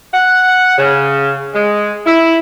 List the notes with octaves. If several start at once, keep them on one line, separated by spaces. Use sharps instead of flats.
F#5
C#3
G#3
E4